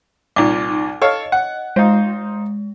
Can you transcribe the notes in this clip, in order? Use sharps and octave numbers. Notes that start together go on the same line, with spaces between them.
C2 A#2 D#4 D6
A4 C#5 D#5 F5
F#5
G#3 D#4 F4 C5